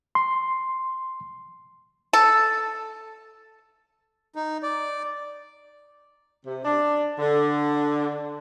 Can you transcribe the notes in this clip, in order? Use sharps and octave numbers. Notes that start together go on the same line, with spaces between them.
C6
A4
D#4
D5
C3
D4
D3